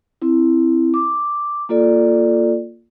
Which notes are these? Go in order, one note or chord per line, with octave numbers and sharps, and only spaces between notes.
C4 E4
D6
A#3 F4 A4 D5